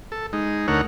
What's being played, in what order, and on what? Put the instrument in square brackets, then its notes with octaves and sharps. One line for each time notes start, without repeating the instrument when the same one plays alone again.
[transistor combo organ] A4
G#3 D#4
D2 A3 D#4 A#4 C#5 F#5